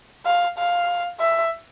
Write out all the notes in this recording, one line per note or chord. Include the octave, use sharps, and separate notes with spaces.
F5
F5
E5